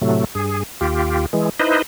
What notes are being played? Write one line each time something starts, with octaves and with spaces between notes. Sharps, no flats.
A2 C3 F#3 A3
G2 G#4
D#2 F4 G4
E3 G#3
D#4 E4 B4 C5 D#5